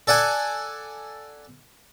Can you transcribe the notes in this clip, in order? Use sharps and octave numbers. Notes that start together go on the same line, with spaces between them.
A4 D5 F#5 G#5